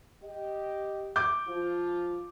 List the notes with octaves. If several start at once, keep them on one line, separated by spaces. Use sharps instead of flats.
G4 D#5
D6 G6
F3 F4